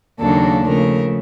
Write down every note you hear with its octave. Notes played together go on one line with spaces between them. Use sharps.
D#2 C#3 F#3 A#3 D4 A4
C#3 F3 A3 A#4